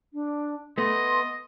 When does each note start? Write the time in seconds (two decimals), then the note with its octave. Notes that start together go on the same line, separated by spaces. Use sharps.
0.13 D4
0.78 A3 B3 D#5 C6